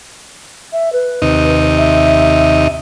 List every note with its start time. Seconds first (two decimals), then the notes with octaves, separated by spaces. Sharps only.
0.73 E5
0.93 B4
1.22 D#2 C3 D#4
1.78 E5